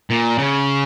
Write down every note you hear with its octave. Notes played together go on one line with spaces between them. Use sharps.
A#2
C#3